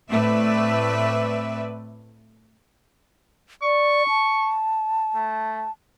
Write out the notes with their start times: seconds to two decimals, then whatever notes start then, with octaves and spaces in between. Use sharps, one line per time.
0.10 A2 A3 C4 B4 D5 E5
3.62 D5 C#6
4.08 A5
5.15 A3